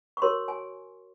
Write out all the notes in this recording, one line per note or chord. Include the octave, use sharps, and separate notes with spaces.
C#6
F#4 A#4 C#5 C6
G#5